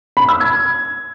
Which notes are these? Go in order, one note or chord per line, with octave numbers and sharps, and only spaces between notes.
B5
E6
G#6